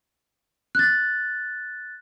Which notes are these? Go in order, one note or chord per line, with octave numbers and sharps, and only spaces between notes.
F#6 A6